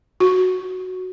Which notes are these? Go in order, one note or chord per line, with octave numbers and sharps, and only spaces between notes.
F#4